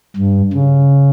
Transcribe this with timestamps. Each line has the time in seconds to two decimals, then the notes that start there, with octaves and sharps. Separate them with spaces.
0.17 G2
0.53 C#3